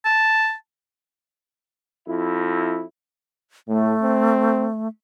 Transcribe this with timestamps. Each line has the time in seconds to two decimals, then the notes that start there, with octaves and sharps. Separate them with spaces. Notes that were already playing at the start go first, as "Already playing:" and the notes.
0.05 A5
2.09 F2 E4
3.68 A2 A3
4.03 C4